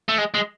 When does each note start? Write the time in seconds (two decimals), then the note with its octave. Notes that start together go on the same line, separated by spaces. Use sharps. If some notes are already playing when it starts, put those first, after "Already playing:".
0.09 A3
0.18 G#3
0.34 G#3